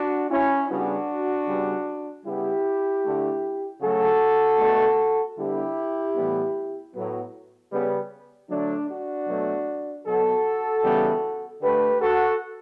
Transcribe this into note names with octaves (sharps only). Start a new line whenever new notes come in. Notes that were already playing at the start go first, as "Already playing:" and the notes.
Already playing: D4 F#4
C#4 E4
C#3 G3 B3 D4 F#4
C#3 G3 B3
C#3 G3 B3 E4 G4
D3 A3
C#3 F#3 A3 F#4 A4
B2 A3
D3 G3 B3 E4 G4
A2 E3 G3 B3
A2 F#3 B3
C#3 G3 B3
D3 F#3 A3 D4
D4 F#4
B2 F#3 A3
B2 F#3 B3 F#4 A4
C#3 E3 G3 B3
D3 A3 G4 B4
F#4 A4